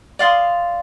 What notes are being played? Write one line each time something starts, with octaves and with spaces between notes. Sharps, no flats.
D5 F5 C6 D#6